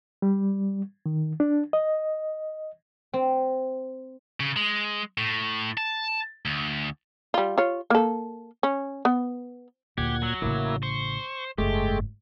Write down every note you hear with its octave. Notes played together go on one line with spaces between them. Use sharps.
G3
D#3
D4
D#5
C4
C#3
G#3
A2
A5
D2
G3 F4
F4 C#5
A#3 A4
C#4
B3
D2 A#2 G4 F#5 G#6
F#3
A1 C#3 A#3 E4
C5 C#6
F#1 G#2 G#3 A3 G4